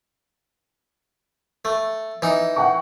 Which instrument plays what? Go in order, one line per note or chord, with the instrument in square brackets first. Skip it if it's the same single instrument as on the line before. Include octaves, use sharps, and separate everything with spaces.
[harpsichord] A3
E3 D#4
[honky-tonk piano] F#5 G5 C#6